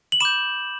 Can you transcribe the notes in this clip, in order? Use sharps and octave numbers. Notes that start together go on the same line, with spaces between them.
F#7
B5 D6 G6 E7